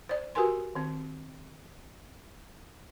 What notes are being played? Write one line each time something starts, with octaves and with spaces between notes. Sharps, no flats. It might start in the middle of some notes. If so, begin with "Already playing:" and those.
C5 D5
F#4 G4 A#4 B4 G#5 C6
D#3 C4